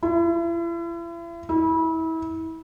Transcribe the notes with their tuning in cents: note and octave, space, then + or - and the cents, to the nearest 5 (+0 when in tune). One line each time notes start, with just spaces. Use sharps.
E4 +40
E4 -30